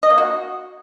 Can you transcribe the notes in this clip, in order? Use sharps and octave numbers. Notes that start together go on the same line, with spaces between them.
D#5
A#3
F#4